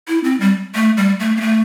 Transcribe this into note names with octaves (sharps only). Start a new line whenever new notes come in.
E4
C4
G3
A3
G3
A3
A#3
A3